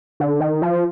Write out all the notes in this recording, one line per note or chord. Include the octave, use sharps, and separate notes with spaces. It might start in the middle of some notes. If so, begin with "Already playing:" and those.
D3
D#3
F3